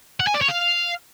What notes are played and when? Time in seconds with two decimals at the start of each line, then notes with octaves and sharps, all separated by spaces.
0.20 F#5
0.27 G#5
0.34 D5
0.41 C#5
0.48 F5